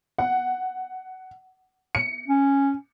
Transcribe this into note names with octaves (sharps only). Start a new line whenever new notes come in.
F#5
C#7
C#4